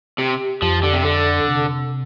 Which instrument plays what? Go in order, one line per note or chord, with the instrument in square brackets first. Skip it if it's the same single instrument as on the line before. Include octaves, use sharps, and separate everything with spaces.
[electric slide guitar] C3 [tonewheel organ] G4
[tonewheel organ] F2 [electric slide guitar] F3
[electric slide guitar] D3
C3
[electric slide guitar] D3 [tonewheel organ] A4
[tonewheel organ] C3